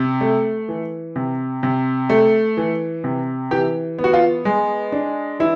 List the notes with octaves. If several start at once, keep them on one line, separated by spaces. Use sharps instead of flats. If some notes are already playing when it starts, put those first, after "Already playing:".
Already playing: C3
A3
E3
C3
C3
A3
E3
C3
E3 G4
B3
F#4
F4
G#3
D4
E3 E4